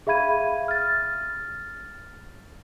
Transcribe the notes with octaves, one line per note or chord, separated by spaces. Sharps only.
G#4 E5 F5 B5 G#6 D#7
F6 A6